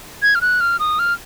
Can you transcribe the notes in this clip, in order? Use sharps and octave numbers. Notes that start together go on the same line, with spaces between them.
G#6
F6
F#6
F6
D#6
F6